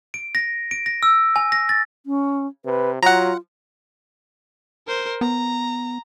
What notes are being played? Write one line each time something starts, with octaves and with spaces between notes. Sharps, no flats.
D7
A#6
D7
A#6
E6
G#5
A#6
A6
C#4
C3 B4
F#3 F4 F#5 A#5
A#4 C5
B3 A#5